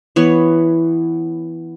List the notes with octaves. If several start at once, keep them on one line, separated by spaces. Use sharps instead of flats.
E3 B3 C#5